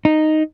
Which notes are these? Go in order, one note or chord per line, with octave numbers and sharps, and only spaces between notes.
D#4